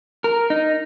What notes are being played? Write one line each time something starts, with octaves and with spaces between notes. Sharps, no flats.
A#4
D#4